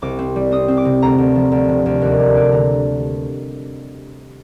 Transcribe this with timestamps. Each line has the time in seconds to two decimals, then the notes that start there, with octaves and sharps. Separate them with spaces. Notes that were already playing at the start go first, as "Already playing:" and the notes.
0.02 C2 D6
0.19 C4
0.36 G3
0.51 C4 D#6
0.68 C4
0.77 D6
0.85 C3
1.02 D2 A#5
1.18 D2
1.35 F3
1.52 D2
1.68 C3
1.86 D2
2.01 D#2
2.19 G3
2.35 D4
2.52 D3 A#5